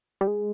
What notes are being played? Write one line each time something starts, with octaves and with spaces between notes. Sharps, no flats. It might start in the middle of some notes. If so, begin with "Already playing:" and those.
G3
G#3